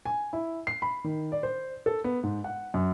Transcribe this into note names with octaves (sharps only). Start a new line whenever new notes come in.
G#5
E4
C7
B5
D#3
D5
C5
A4
B3
G#2
F#5
F#2